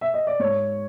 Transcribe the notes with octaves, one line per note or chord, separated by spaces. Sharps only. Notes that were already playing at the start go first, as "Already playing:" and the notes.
E5
D#5
D5
G#2 C#5